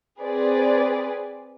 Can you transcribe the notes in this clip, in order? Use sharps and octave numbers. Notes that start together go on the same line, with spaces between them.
C4 G#4 B4 D5